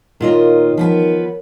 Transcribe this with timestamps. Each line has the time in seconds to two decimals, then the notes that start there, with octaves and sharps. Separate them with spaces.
0.21 A#2 D#3 F4 A#4 C#5 D#5
0.77 F3 B3 B4